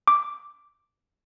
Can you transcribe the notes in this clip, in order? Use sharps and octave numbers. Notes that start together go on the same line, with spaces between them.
D6